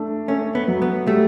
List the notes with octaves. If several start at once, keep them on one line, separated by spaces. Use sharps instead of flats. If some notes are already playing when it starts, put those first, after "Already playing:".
Already playing: A3 D4
A3 C#4
B3
F#3
B3
G3 A3